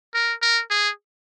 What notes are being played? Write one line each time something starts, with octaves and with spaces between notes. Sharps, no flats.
A#4
A#4
G#4